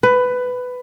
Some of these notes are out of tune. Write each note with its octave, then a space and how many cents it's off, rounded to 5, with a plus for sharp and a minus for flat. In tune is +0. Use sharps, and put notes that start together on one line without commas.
B4 +15